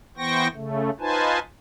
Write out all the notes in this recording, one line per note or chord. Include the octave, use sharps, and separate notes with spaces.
E3 B3 C5 G5 C#6 A#6
C#3 A3
D#4 F4 B4 C5 G#5 A5